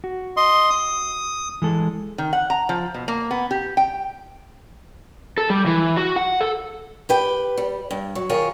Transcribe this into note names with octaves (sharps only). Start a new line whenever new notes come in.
F#4
D#5 C6
D#6
E3 G#3 A4
D#3
F#5
A#5
F3
B2
A#3
B3
G4
G5
A4
G3
E3
F#4
F#5
A4
G4 B4 G5
G3
G2
F#3
D#3 F4 G#4 A#4 C#5